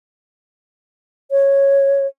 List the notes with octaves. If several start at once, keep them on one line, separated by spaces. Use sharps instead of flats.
C#5